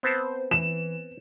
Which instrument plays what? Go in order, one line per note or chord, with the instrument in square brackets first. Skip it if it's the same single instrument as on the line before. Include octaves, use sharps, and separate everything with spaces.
[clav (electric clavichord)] B3 C4 A5 [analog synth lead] C5
[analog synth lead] E3 [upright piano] E7